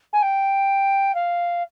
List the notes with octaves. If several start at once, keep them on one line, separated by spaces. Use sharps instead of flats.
G#5
G5
F5